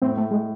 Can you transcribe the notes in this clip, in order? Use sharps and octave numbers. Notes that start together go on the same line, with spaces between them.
A2 C4
A3
G#3